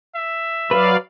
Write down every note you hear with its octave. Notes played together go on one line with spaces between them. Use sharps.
E5
F#3 B4 D5 F5